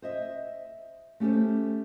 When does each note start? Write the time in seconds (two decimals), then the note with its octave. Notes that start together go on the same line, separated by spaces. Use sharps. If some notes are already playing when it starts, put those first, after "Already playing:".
0.02 C5 D#5 E5
1.20 A3 C#4 G4 A4 C5